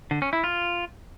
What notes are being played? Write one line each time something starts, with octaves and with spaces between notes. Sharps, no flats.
D3
C#4
E4
F4